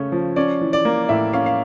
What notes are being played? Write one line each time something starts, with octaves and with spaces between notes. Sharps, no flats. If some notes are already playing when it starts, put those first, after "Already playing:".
Already playing: C#3 A3 C#4
F3
C#4 D5
E3
D5
A#3
A2 E5
C#4 F5
F5